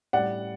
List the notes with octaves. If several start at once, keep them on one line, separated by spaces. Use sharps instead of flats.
A2 G3 D5 F#5